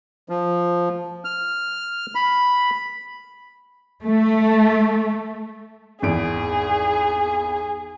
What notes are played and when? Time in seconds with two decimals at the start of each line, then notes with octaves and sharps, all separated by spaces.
0.29 F3
1.25 F6
2.15 B5
4.03 A3
6.02 G#1 E2 G#4 D7